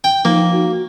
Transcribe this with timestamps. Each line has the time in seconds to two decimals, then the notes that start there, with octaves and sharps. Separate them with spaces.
0.04 G5
0.25 F3 A#3 D#4
0.52 F#4